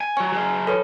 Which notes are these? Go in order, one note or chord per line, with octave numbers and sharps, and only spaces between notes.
G#5
F#3 C#5 G#5
F#3 G#4
A4 B4 C#5